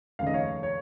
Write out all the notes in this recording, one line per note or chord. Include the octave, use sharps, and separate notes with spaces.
F1 D#2 C#3 F5
D#5
C#5 F5
C#5